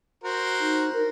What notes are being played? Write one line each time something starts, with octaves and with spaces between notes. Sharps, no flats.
F#4 A#4 C5
D#4
A#4